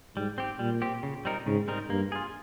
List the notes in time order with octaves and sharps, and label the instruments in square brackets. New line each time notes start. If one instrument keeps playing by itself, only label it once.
[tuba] G#2 [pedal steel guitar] G3
[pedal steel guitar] C4 G4
[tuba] A#2 [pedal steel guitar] G3
[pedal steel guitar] C4 G4
C#3
G3 C4 D#4 A#4
[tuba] G#2 [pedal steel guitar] C#3
[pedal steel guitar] G3 C4 D#4 A#4
[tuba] G2 [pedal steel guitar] A#3
[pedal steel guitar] F4 G#4